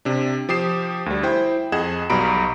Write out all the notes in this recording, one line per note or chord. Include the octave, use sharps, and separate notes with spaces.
C3 D4
F3 G4 D#6 C7 E7
D2 G3
E4 C5 G5
F2 G#4 D#5 F#5 G#6 E7
B1 B2 G3 A#5 B5 D7